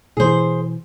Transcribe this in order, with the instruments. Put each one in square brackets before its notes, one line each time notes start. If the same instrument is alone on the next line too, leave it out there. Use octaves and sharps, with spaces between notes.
[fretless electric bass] B2 E3 [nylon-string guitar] G#4 C5